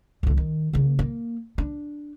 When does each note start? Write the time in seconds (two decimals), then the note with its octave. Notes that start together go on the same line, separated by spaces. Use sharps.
0.23 C#2 D3
0.37 D#3
0.73 C#3 A#3
0.99 A#3
1.58 D4